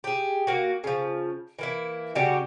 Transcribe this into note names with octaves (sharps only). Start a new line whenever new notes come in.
G4 G#4
A#3 F#4
C#3 F3
E3 A#3 E4
C#3 G3 F#4 G4